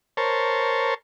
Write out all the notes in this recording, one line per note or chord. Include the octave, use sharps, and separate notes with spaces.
A#4 C5 C#5 A5